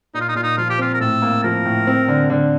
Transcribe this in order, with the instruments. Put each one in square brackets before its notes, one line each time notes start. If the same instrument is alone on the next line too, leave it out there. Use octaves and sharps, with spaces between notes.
[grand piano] A#2 [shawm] D#4
[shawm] F4
D#4
[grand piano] A#2 [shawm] F4
[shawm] D#4
[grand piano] F3 [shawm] F4
[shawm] G4
[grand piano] C4 [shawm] F4
[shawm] A#4
[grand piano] A2 [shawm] A4
[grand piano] A#3
[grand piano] F3 [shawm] A#4
[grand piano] A2
C4
D3
D3